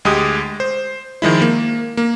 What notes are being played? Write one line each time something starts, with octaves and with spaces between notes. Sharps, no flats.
D2 G#3 G4 D#6
C5
D#3 F3 G#3 E4
A#3
A#3